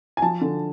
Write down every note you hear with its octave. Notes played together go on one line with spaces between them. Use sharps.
G#5
F3 A5
D3